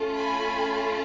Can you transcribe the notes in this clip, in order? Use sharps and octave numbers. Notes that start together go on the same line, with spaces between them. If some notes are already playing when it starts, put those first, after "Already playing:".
Already playing: A3 C#4 F4
G#5 B5